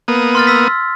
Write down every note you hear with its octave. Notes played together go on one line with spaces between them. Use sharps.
A#3 B3 D#6
C6 F6 A6
E6 B6